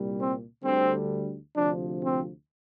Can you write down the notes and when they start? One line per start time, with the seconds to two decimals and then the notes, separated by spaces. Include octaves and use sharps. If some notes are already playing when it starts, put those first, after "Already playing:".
Already playing: C2 A#2 G3
0.19 C4
0.64 D2 D3 G3 C4
1.56 D2 C3 F3 D4
2.03 C4